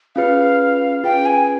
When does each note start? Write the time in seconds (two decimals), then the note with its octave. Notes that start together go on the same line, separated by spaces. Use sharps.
0.16 C#4 F4 G#4 B4 F5
1.04 C#4 F4 G#4 B4 G5
1.26 G#5